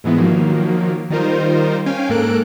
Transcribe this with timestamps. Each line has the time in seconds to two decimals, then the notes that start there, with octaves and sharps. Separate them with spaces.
0.04 G#2 E3 G#3 B3 E4
0.17 D#3 F3 F#3 A#3
1.10 D#3 G3 D#4 F4 A#4 C5
1.86 C#4 F5 G5 G#5
2.09 G#2 A#3 A4 A#4 F#6 D7